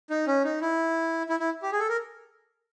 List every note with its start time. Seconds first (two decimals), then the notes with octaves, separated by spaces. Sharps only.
0.10 D#4
0.27 C#4
0.44 D#4
0.61 E4
1.29 E4
1.40 E4
1.63 G4
1.72 G#4
1.80 A4
1.89 A#4